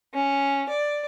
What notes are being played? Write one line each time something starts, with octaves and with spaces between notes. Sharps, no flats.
C#4
D5